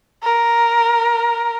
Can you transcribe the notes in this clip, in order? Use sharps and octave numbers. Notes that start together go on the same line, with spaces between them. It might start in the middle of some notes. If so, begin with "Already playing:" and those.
A#4